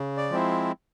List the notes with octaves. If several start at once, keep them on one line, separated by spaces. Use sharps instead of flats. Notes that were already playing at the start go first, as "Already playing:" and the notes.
Already playing: C#3
D5
F3 G#3 C4 E4